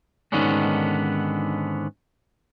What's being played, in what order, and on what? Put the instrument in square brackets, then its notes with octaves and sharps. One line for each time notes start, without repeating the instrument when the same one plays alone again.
[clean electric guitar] G#2 D3 D#3 B3 C#4 D4